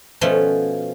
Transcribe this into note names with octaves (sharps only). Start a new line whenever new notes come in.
B2 F3 A3 C#4